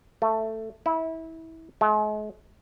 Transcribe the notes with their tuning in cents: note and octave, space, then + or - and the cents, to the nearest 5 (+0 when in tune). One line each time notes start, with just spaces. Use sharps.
A3 +10
E4 -25
G#3 +40